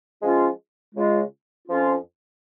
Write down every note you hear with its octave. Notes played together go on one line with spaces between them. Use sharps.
F3 G#3 C#4 F4
C#3 G#3 F4
F2 F3 C#4 F4